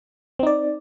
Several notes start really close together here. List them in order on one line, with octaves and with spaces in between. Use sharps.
C4 D#4 D5